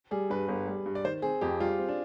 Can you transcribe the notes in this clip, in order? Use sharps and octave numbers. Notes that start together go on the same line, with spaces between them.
G3 G#4
G2 B4
G1
G3
G2
D5
D#3 C5
C4 G#4
F2 G4
G3 F4
C4
D4